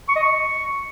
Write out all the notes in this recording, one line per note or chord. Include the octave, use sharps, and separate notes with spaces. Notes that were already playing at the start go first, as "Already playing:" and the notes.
C#6
D#5
C#6